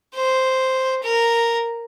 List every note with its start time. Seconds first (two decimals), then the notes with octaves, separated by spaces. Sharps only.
0.14 C5
1.03 A#4